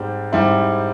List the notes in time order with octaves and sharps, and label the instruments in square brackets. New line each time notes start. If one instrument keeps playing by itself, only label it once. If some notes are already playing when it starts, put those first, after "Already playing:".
Already playing: [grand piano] G#2 G3 C4
G#2 G3 C4 E4